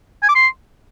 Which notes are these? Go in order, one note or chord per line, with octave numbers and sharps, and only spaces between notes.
G#5
D6
C6